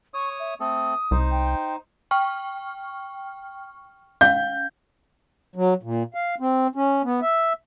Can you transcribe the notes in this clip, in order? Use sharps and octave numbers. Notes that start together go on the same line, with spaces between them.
C#5 C#6 D#6
E5
A3 C4 A4 D#6
C2 D#4 C5
G5
G5 C#6 F6
C#4 F5 G6
F#3
A#2
F5
C4
C#4
B3
E5